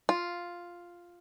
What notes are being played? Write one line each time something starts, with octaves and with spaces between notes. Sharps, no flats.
F4